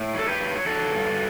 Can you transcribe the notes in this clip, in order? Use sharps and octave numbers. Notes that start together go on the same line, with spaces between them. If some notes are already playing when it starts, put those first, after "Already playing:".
Already playing: A2
F#3 A4
G4 B4
F#3
F#3 F#4 A4
G2